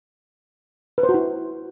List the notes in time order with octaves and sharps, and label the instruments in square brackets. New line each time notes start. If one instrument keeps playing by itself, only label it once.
[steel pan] B4
C5
F#4
E4